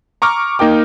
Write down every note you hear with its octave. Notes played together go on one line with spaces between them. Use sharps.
A#5 C#6 D6 F6
A#3 D#4 A#4 G5 D6